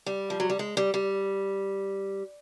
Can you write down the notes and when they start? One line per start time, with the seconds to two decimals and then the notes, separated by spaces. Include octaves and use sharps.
0.06 G3
0.30 F3
0.40 F#3
0.50 G3
0.59 G#3
0.77 G3
0.94 G3